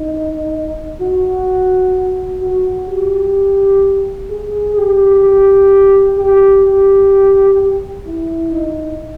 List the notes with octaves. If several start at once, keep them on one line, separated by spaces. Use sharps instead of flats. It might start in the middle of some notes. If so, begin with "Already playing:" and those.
Already playing: D#4
F#4
F#4
G4
G#4
G4
G4
G4
G4
E4
D#4